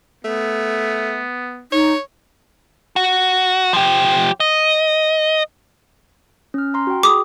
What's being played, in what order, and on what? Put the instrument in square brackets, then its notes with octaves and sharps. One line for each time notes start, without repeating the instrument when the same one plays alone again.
[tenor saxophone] A3 [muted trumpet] B3
[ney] D#4 [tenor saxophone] C#5
[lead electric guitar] F#4
F3 G4
D#5
[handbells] C#4 F6
A#5 C6
F#4 G5
[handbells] G#4 [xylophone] D6 D#6